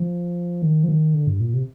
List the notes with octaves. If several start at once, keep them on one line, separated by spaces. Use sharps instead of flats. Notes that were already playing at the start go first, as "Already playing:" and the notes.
Already playing: F3
D#3
F3
D#3
D3
G2
A#2
C3